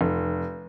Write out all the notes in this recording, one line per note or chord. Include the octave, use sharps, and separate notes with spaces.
F1